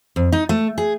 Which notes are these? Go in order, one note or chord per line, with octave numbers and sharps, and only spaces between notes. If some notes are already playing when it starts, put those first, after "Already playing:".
F2
D#4
A3
G#4